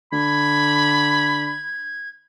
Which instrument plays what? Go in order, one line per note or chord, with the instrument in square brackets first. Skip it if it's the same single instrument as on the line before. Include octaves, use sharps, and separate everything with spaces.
[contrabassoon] D3 [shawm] B5 [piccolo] G#6